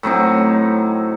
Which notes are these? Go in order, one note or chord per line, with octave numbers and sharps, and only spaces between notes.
A2 F#3 C4 D#4